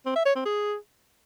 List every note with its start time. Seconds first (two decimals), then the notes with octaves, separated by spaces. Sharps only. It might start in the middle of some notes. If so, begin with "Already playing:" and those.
0.06 C4
0.16 E5
0.25 C#5
0.35 C4
0.45 G#4